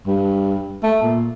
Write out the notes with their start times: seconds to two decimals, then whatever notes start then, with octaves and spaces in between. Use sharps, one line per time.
0.07 G2
0.83 A3
1.03 A#2